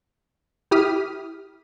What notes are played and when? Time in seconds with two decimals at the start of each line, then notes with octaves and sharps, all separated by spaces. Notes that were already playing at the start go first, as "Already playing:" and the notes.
0.71 E4 G4 D#6 F6 B6 D#7